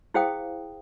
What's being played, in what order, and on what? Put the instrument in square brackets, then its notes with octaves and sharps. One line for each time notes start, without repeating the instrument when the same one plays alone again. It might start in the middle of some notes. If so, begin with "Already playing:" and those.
[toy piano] E4 G#4 C5 F5 G5 D#6